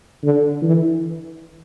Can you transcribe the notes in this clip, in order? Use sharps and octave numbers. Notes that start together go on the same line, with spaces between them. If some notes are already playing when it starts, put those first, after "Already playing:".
D3
E3